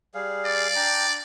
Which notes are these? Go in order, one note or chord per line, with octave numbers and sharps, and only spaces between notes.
G3 G#4 F5
D5
D4 G5 A#5